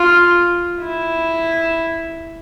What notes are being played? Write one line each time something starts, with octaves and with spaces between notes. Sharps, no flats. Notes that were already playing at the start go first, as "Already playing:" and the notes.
Already playing: F4
E4